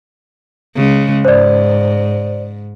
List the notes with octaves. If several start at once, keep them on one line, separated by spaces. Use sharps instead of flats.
C#3 G#3
G#2 C5 D5